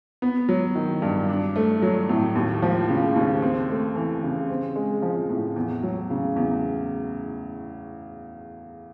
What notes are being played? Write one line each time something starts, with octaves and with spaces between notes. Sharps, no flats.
B3
F#3
D#3
G2
D4
A3
F#3
A2
D#2
F3
C#3
D#2
C4
A3
E3
C#3
C4
G#3
F3
A2
E2
F#3
C#3
E2